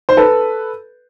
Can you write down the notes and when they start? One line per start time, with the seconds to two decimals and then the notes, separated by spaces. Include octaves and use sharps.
0.09 C5
0.17 A4 B4